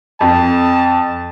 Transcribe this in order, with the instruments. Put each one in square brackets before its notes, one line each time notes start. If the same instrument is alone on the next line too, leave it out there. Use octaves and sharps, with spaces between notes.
[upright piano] F2 [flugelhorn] A5